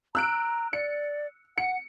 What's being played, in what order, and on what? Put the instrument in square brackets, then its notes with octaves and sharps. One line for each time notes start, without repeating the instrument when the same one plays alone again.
[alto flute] A#5 [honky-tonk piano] E6 F#6 D7
[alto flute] D5 [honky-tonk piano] C#7
[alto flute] F#5 [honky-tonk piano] C#7